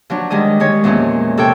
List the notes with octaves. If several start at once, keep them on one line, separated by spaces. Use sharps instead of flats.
F3 F#3 D4
D#3 G3 G#3 D#5
D#3 G#3 C#5
E2 A#2 F3 C#4
C3 A4 C#5 G5